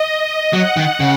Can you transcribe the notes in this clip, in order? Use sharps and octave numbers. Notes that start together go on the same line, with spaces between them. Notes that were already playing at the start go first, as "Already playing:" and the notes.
Already playing: D#5
F#3 F#5
D#3
C#3